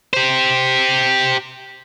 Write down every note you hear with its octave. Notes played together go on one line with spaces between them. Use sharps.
G4 C5